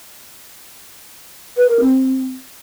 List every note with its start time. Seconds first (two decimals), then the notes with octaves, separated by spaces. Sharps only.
1.57 B4
1.68 A#4
1.80 C4